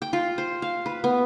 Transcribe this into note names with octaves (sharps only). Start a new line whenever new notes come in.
G5
F4
C5
F5
B4
B3